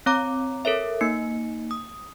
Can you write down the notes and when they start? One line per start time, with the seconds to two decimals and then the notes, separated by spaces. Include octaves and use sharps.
0.06 C4 C#5 A#5 D6
0.65 A4 A#4 C#5 E5
1.01 A#3 D#4 C#7
1.71 D#6